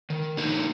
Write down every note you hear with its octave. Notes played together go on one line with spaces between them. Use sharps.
D#3
A#3 D#4 F#4